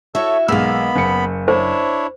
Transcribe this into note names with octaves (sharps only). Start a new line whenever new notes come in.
E4 F#4 A4 C#5 E5
B1 G#3 A#3 B3 F5 B5 E6
F#1 C#7
D4 E4 C5 C#5